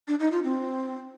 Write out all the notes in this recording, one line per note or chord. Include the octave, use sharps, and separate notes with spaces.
D4
D#4
F4
C4